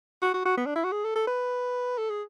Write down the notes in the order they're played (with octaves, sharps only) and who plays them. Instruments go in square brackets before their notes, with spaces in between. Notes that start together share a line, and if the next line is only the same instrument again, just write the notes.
[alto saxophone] F#4
F#4
F#4
B3
D4
E4
F#4
G#4
A4
A4
B4
A4
G#4